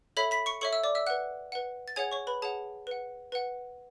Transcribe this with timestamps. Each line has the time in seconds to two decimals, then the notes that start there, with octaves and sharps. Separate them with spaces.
0.17 A4 C#5 E5 B5 B6
0.31 B5 B6
0.46 C#6 C#7
0.61 A4 C#5 E5 C#6 C#7
0.73 E5 E6
0.84 D5 D6
0.95 E5 E6
1.06 B4 F#5 F#6
1.52 B4 F#5
1.88 A6
1.96 G#4 C#5 F#5 G#5 G#6
2.12 C#5 C#6
2.27 B4 B5
2.42 G#4 C#5 F#5 A5
2.87 B4 F#5
3.32 B4 F#5